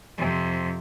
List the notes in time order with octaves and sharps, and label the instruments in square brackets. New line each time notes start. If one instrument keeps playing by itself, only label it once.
[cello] F2 C3